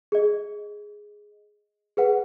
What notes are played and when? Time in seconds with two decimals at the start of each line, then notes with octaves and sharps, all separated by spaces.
0.12 G#4 D#5
1.97 G#4 B4 F#5